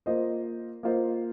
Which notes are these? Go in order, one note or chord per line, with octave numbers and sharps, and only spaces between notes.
A#3 F4 C5 D#5
A#3 F4 C5 D#5